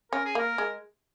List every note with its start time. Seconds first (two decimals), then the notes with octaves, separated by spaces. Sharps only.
0.12 C#4 A#4
0.25 G#4
0.35 A#3 A#4
0.58 G#3